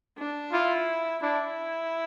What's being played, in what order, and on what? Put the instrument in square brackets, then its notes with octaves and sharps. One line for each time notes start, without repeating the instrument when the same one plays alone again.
[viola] D4
[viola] E4 [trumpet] F4
[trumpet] D4 [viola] E4